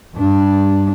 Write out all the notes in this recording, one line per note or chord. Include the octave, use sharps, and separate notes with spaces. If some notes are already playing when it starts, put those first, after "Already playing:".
G2 D4